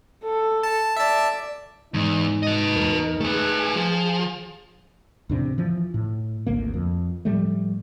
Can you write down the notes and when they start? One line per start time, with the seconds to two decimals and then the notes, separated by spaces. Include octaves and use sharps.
0.24 A4
0.63 A5
0.97 D5 E5 A5
1.94 E2 G#2 D#4
2.43 B4 D#5
2.76 E2 A#4
3.20 A3 G#4 B4
3.75 F3
5.29 E2 A2 C3 D4
5.58 E3 F3
5.94 A2
6.47 G#1 D2 A#3
6.74 F2
7.25 A2 F3 G3 A3